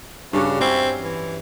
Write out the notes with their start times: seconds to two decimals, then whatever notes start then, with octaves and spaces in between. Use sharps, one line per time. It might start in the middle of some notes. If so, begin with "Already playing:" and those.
0.33 G2 C#3 D4 F#4
0.61 C4 C#4 E4
1.00 E3